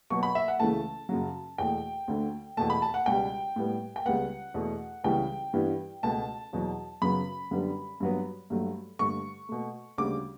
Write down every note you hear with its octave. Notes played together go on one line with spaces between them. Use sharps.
B2 F#3 B3 C#6
B5
E5
F#5
C#2 C#3 E3 A3 A5
F#2 C#3 F#3
E2 B2 A3 G5
D2 D3 A3
E2 B2 A3 A5
B5
A5
F#5
C#2 B2 G3 G5
A2 G3 B3
G5
C#2 C#3 G3 B3 F#5
E2 B2 A3
C#2 C#3 E3 G3 B3 G5
G2 E3 G3 B3
C#2 B2 A3 A5
E2 B2 F#3
F#2 C#3 F#3 B3 B5
F#2 D3 G3 B3
G2 F#3 B3
G2 F#3 A3
G2 D3 A3 C#6
B2 A3
D2 C#3 G3 D6